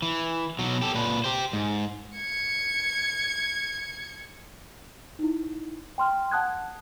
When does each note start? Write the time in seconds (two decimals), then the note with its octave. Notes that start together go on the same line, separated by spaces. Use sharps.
0.02 E3
0.59 B2 F#3
0.82 G4 A4
0.95 A#2 B4
1.24 G4 C5
1.53 G#2
2.15 G#6 C#7
5.19 D#4 E4
5.98 G5 C6 F6
6.31 F#5 A5 D#6 F#6 G#6